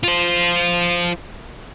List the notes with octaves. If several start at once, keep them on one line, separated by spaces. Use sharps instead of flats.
F4 C5